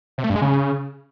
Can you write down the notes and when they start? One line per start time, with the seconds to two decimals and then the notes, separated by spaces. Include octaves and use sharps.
0.18 C3
0.24 A3
0.30 G2
0.36 G#3
0.42 C#3